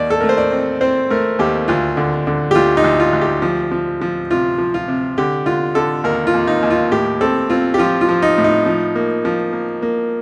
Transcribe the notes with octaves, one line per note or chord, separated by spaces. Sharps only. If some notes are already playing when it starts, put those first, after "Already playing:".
Already playing: D#2 D5
A4
A3 A#4
C5
D5
C4
C4 C5
A3 A#4
D#2 G4
D2 F4
D3
D3
G4
D2 F4
D#4
D2
F4
D2
G4
F3
F3
F3
C3 F4
F3
F4
C3
D3 G4
D3 F4
D3 A4
D#2 A#4
F4
D#2
D#4
D#2
F4
A2 G4
C4 A4
C4 F4
G4
F3 F4
F4
F3
D#4
A2
D#4
F3
A#3
F3
A#3
A#3